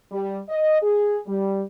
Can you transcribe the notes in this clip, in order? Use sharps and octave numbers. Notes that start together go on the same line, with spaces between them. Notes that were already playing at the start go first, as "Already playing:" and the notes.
G3
D#5
G#4
G3